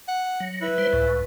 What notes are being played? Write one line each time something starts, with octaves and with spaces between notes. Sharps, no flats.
F#5
F#3
E4 B4
G3 C5
C#2 A2